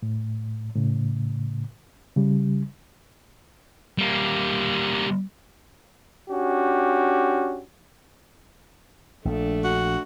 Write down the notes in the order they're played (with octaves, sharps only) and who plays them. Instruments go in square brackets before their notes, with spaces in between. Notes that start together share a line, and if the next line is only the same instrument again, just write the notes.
[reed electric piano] A2
A2 C#3
C#3 G3
[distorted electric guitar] G3 A#3
[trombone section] C#4 D4 F#4 G4
[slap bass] A#1 [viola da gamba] A3 D4 A4
[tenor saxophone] F#4